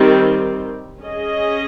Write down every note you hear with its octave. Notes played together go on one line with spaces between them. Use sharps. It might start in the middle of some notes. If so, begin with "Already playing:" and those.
Already playing: D#3 G3 C4 G4
C#4 G#4 D#5